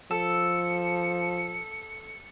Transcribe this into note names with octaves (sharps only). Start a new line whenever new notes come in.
F3 A4 C#7